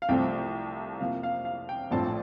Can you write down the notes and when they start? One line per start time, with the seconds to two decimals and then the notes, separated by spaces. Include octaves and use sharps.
0.02 F5
0.09 C2 C3 F3 A3 C4 G5
1.00 F2 C3 F3 A#3 F5
1.23 F5
1.45 F5
1.69 G5
1.91 A#1 A2 F3 C4 A5